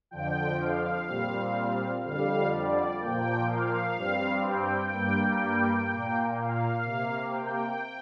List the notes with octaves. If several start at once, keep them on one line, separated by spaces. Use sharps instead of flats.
F2 D3 F3 G5
F5
A#2 G3 C4
F2 D3 G3 F5
D5
A#2 F3 A#3 G5
F5
G2 G3 C4
G5
G2 G3 A#3
A#2 A#3
F5
C3 A#3
G5